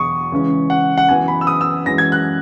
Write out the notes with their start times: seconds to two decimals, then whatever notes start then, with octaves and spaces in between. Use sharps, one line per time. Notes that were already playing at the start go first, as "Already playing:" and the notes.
Already playing: E2 B2 F#3 C#6 D#6
0.32 C#3 E3 G#3 C#4
0.70 F#5
0.98 F#5
1.09 F#2 E3 B3 G#5
1.28 B5
1.41 E6
1.47 D#6
1.61 E6
1.86 F#2 E3 G#3 C#4 A#6
1.98 G#6
2.12 F#6